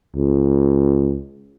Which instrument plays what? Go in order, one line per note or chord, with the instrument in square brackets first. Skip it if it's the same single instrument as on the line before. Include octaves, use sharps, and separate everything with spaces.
[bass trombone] C#2